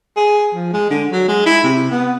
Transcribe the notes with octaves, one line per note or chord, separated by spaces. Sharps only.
G#4
F3
G#3
D3
F#3
G#3
E4
C3
B3